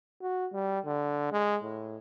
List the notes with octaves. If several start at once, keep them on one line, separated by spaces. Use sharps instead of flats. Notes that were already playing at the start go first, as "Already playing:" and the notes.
F#4
G3
D3
G#3
A2